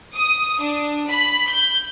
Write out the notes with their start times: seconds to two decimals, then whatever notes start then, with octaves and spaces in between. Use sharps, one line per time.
0.15 D#6
0.62 D4
1.09 B5
1.50 G6